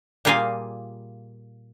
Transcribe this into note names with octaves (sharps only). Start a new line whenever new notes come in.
A#2 G3 A#3 F4 G#4 G#5